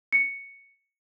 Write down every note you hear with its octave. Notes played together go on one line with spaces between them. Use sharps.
C#7